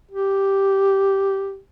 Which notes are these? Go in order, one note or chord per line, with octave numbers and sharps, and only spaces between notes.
G4